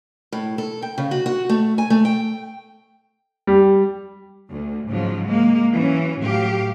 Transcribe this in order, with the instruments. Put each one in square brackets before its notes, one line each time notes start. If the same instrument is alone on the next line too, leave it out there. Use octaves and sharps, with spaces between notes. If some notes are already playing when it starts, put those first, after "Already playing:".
[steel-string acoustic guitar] A2
A4
G5
C#3
F#4
F#4
A3
G#5
A3
G5
[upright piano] G3
[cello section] D2
G#2 C#3 F3 F#3
G#3 A#3
E3 F#3 C#4
A2 F#3 G4 F5